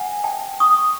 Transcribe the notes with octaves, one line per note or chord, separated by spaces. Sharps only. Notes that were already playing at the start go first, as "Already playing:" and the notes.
Already playing: B4 F#5 G#5
G5 A5
C#6 D#6